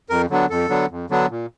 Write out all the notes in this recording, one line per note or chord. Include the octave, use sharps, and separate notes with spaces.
F2 A#4
D3 F#3 B3 D4
F2 A4
D3 F#3 B3 D4
F2
D3 F#3 B3 D4
A#2